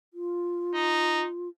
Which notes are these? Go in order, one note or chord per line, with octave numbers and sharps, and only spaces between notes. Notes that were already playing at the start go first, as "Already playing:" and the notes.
F4
D#4